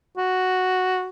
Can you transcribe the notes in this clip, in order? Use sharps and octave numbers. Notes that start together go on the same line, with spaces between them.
F#4